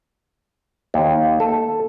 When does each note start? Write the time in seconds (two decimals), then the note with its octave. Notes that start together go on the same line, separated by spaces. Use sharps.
0.94 D#2
1.40 A4